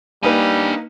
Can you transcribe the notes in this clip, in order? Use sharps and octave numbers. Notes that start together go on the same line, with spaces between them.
G3 A#3 D4 D#4 B4 G#5